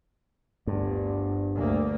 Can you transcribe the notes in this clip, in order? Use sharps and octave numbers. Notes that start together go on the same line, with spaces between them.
G1 D2 G2
D2 A#3